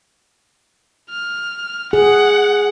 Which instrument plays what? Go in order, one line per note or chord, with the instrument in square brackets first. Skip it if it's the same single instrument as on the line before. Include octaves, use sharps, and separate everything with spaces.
[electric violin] F6
[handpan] G#4 [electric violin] F#5